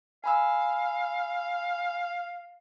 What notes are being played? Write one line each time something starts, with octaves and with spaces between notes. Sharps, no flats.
F5 G#5 B5 E6